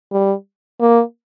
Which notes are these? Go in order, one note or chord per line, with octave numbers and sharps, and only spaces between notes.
G3
A#3